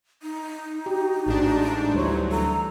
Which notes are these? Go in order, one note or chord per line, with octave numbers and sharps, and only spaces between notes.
D#4
F#4 G4
A1 G#2 D4
D2 E3 F#3 G3 C5 C#5
A4 A#5